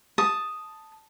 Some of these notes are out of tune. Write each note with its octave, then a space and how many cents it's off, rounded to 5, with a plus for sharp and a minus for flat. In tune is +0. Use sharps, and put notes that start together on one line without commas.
A5 +0 D#6 +0